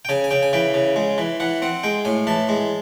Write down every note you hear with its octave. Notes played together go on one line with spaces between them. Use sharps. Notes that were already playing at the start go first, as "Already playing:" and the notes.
G5
C#3 G#5
G#5
C#3 G5
G#5
E3 G5
C#3
G#3
E3
E3 F#5
C4 F#5
G#3 G5
A2 G#5
E3 A5
G#3